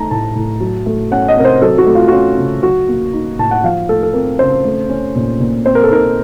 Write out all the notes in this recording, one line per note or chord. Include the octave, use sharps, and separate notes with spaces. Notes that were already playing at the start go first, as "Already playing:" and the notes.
Already playing: A3 D#4 A5 A#5
A2 A5
A2
F#3
A3
C#4 F#5
D#5
C3 A#4
C5
F#3 A4
F#4
A3
F4
F#4
C#4 F4
C#3
F#3 F#4
A#3
D#4
A2 A5
F#5
F3 F5
A3 A4
A4
C4 A#4
C#3 C5
A3
C#4
A#2
A#2
C4 C5
A#4
A4
D#4 A#4